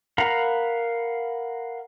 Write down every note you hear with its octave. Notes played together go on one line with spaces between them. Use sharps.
A#4 F5 F#5 A#5 B5